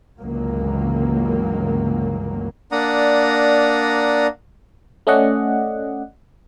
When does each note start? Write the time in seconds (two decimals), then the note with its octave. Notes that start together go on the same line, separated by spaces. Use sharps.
0.19 G1 C#2 E3 F#3 A#3
2.72 A#3 D4 D5 F#5 A#5 D#6
5.07 A3 C#4 D5 D#5 F#5